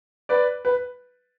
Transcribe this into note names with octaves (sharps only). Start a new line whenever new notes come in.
B4 D5
B4